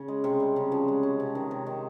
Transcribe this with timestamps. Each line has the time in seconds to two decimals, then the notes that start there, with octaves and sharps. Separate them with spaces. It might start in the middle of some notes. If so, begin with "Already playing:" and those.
Already playing: C#3
0.08 G#3
0.24 C3
0.40 G3
0.56 C#3
0.72 F3
0.88 G#3
1.03 C#4
1.20 C3
1.35 D#3
1.51 C3
1.66 D#3